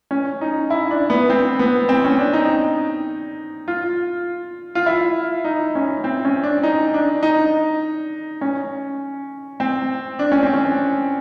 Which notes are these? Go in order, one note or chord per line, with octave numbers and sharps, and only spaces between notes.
C#4
D#4
E4
D4
B3
C4
B3
C4
C#4
D4
D#4
F4
F4
E4
D#4
C#4
C4
C#4
D4
D#4
D4
D#4
C#4
C4
D4
C#4
C4
C#4